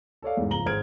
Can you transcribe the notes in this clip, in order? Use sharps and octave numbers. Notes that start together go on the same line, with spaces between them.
A4 C#5 D5 F5
E2 G#2
F#1 F3 A#5 F#7 G7
G#1 G#4 C5 F6 G#6 D7